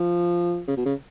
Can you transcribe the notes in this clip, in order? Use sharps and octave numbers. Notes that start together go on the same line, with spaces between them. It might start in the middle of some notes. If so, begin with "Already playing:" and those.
Already playing: F3
C#3
B2
C#3